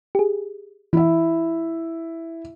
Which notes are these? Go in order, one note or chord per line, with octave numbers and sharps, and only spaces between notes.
G4 G#4
E3 E4 E5